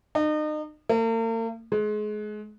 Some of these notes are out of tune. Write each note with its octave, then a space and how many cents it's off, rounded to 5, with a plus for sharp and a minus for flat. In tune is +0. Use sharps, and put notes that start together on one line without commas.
D#4 -35
A#3 -45
G#3 +30